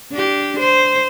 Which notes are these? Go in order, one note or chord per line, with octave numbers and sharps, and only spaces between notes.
D4 G4
C5